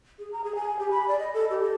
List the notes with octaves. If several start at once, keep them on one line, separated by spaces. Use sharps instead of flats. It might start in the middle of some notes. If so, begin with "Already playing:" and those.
G#4
A#5
G#4
G#5
G4
B5
D5
D#5
A4
G4
A4